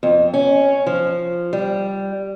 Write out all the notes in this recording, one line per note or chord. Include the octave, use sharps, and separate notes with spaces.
F2
C#4
F3
G3